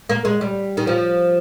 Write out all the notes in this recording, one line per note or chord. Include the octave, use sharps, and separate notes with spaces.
A#3
G#3
G3
D#3
F3